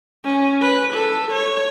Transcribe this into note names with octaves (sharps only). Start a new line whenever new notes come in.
C#4
B4
A4
C#5